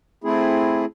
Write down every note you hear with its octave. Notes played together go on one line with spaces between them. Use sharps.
A3 C4 E4 G#4